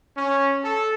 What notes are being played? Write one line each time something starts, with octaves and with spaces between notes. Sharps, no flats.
C#4
A4